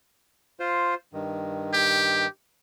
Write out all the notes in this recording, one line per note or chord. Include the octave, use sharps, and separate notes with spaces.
F4 C5
G2 D#3
G4